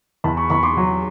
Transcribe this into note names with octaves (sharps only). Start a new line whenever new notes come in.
E2 A5 B5
B5 C#6
E2 B5 C#6
C6 D6
F#3